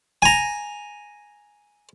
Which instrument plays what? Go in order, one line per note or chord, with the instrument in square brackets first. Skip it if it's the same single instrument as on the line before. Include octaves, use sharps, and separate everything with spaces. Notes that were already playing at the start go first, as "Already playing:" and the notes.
[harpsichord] G#5 A#5